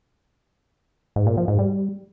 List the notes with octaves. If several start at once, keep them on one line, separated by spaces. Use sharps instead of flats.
G#2
A#2
F3
G#2
G3